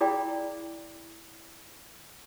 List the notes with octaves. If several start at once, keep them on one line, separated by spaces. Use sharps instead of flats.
E4 G#4 D5 F5 G5 B5